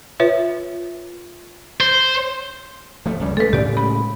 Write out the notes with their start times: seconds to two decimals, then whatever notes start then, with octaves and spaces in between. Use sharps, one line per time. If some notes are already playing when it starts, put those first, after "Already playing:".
0.20 F4 B4 C#5 E5
1.81 C5
3.06 F3 A3
3.20 C#2 C#3 G3
3.37 G#3 A3 A4 B4
3.53 A2 C#3 G#3 G4 D5
3.77 B5